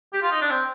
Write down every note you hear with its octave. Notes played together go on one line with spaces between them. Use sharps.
G4
F4
D#4
D4
C4